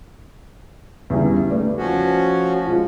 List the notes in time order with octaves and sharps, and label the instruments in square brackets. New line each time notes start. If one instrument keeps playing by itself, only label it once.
[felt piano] E2 C#3 G3
A3 B4 D5
[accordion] F3 C#4 F#4
[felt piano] G#3 F4